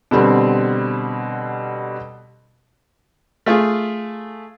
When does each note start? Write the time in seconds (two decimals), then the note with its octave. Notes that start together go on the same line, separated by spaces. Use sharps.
0.11 B2 D3 G3 C4
3.46 A3 F4 G#4